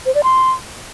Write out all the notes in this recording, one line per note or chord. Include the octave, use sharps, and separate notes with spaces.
C5
D5
C6